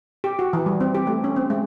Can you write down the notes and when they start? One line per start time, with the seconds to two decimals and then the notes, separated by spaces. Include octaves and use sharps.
0.24 G4
0.39 F#4
0.53 E3
0.66 G3
0.80 C4
0.95 G4
1.07 A3
1.24 C#4
1.36 C4
1.50 G#3